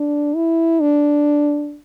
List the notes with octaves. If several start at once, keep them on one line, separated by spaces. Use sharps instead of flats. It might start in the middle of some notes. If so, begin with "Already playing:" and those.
Already playing: D4
E4
D4